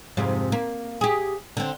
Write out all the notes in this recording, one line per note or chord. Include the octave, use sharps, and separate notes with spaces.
F2 G#2 C3
A#3
G4 G#4
D3 C4